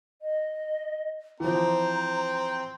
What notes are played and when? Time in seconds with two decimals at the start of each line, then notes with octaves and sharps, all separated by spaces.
0.22 D#5
1.40 E3 F3 C4 A#5